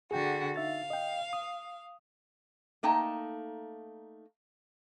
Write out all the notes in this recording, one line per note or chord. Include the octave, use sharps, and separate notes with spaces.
D3 F#4 G#4 G5
D#4 E5 F5 A6
D#5 G5
D#6
A3 A#3 D#4 G5 A5